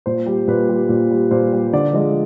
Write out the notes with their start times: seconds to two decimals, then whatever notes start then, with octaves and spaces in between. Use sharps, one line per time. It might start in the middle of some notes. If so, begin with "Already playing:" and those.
0.06 A#2 C5
0.26 G3
0.48 A#2 B4
0.68 G3
0.89 A#2
1.10 G3
1.31 A#2 C5
1.52 G3
1.73 D3 D5
1.93 F3 G#3 D#5